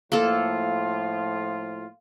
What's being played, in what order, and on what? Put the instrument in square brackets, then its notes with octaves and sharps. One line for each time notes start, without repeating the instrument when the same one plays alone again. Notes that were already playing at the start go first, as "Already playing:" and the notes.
[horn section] A2 F3 F4 [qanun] A#3 A4